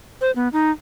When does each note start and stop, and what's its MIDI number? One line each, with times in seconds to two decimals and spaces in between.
0.21 0.31 72
0.36 0.48 59
0.53 0.71 63